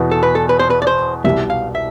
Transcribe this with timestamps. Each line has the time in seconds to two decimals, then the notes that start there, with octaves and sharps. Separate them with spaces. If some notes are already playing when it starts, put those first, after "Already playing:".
Already playing: E2 B2 B3 E4
0.11 A4
0.23 B4
0.35 A4
0.49 B4
0.59 C5
0.70 B4
0.82 D5
0.87 C5
1.24 C2 B2 G3 E5
1.50 F5
1.75 E5